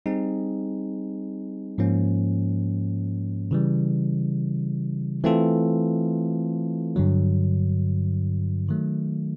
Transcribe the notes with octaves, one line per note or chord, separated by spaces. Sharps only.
G3 C4 D#4 G#4
G#2 F3 A#3 C#4
C#3 E3 G3
E3 A3 C4 F4 A4
G2 D3 F#3
D#3 F#3 A3